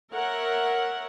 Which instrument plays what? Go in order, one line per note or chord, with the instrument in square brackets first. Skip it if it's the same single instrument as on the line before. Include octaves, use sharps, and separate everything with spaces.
[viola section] A#4 C#5 E5 F#5